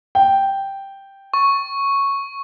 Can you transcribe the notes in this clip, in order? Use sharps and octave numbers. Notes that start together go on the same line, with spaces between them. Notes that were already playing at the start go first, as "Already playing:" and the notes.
G5
C#6